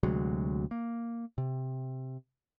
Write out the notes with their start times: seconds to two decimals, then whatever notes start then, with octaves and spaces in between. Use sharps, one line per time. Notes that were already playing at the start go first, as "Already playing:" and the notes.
0.03 D2 C3 F#3 G#3
0.71 A#3
1.38 C3